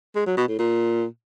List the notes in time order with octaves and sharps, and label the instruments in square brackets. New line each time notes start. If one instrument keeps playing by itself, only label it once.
[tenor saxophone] G#3
F#3
B2
A2
A#2